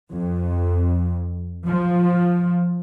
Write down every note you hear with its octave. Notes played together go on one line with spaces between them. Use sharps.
F2
F3